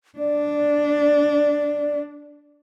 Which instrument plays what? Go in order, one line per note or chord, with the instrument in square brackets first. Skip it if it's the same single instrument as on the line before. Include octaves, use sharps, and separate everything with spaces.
[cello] D4 [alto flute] D5